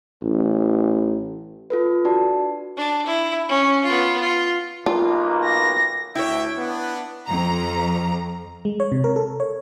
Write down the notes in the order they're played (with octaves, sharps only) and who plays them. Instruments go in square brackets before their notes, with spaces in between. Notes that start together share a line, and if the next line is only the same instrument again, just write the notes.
[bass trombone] A1
[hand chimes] F4 A4 B4
D4 F#4 D5 A5
[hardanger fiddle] D4
E4
C#4
B3 F4
F4
[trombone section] B1 A#3 [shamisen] F4
[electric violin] A#6
[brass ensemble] D2 E5 G5 [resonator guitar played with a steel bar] E4 C#5
[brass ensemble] B3 D4
[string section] F2 A#5
[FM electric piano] G#3
C#5
C3
A#4
A4
C#5